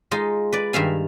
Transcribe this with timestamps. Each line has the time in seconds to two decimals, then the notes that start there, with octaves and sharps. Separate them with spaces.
0.11 G#3 D#4 F4
0.52 B4 D5
0.73 G2 D#3 E5 F5 G#5